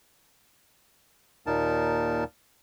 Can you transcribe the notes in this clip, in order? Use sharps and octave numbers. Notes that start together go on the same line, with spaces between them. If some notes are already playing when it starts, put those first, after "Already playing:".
D#2 A#2 D#4 A#4 A5